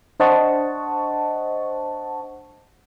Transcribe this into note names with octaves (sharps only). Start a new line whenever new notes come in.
D4 C5 D#5 F#5 A5 C#6